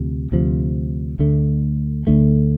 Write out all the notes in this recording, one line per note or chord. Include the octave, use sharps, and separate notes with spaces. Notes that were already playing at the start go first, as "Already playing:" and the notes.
Already playing: D2 C3 F3
D2 C3 F3
D2 D3 A3
D2 D3 A3